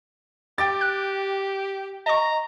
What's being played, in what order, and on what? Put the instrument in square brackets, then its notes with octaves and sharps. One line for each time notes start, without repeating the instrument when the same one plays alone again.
[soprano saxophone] G4 [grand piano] G5 D6 A6
[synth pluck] F#6
[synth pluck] D#5 C#6 [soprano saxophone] A#5